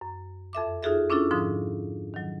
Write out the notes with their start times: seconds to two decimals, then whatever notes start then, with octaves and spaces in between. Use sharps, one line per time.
0.01 F#2
0.53 F2 A4 E5 D6
0.83 D#4 F4 F#4 G#4 A4 E5
1.10 C#4 D4 E4 F4 A4
1.31 G#2 D3 F3 D#6
2.14 D#3 F#3